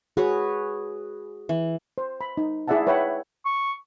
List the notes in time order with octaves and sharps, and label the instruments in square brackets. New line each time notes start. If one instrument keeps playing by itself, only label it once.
[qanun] F#4 B4 C#5 [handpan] G#4
[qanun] E3
[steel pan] C5
B5
D#4
E4 G#4 D5 E5 F#5 A5
B4 C#5 E5 F#5 G5 B5
[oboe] C#6